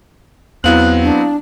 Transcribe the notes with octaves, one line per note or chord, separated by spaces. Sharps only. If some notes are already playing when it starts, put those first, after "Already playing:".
E2 F#3 B3 C4 E4 F5 F#6 F#7
D4